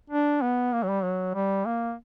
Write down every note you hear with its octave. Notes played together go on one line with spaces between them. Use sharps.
D4
B3
A#3
F#3
G3
F#3
G3
A#3